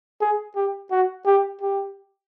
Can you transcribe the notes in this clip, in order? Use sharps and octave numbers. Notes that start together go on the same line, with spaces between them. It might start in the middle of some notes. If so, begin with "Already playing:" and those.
G#4
G4
F#4
G4
G4